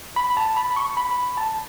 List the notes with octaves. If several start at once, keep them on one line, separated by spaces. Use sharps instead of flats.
B5
A5
B5
C#6
B5
A5